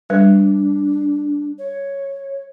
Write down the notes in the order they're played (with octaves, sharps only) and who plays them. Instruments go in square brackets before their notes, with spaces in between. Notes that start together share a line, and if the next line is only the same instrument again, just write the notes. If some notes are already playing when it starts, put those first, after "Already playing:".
[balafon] G3 B4 [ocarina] D4
[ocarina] C#5